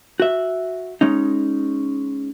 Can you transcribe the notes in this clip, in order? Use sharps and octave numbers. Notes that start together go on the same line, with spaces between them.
F#4 E5
G#3 C#4 D#4